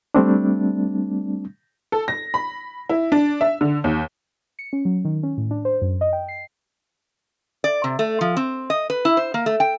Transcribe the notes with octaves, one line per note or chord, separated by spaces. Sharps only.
G3 A3 C4 D4
A4
A#6
B5
E4
D4
E5
D3
D#2
C#7
C#4
F#3
D#3
C#4
A2
D4
C5
F#2
D#5
G5
C7
D5
C3
A3
F3
C4
D#5
B4
E4
C5
A#3
A3
G5